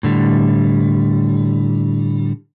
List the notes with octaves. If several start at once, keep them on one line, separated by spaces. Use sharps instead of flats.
A2 D3 G3